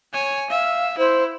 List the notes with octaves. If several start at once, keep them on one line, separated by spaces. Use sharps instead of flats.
C#5 G#5
E5 F5
E4 C5